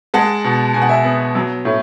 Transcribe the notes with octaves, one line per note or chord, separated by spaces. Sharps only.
G#3 F#5 A5
B2
B2 G#5
F#5
E5 G#5
B3
F#3
A2